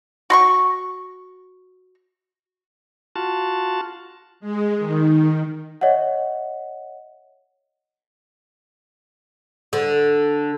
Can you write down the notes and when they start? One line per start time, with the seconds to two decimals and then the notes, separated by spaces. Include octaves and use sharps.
0.30 F#4 C6 C#6
3.16 F4 F#4 A5
4.40 G#3
4.77 D#3
5.81 C#5 D#5 E5 F#5
9.73 D3